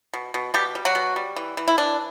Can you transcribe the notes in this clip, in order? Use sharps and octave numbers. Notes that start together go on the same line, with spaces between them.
B2
B2
B2 G3 G4
G3
F#3 F#4
B2
G3
E3
E3
E4
E3 D4